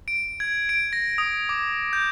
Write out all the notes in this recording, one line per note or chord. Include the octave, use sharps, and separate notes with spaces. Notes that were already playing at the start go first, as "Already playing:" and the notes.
D7
G#6
D7
A#6
D#6
D6
G6